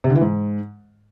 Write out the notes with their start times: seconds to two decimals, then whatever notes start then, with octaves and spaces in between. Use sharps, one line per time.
0.04 C3
0.10 D3
0.16 E3
0.21 G#2